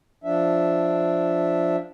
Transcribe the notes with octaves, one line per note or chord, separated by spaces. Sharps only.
F3 D4 E5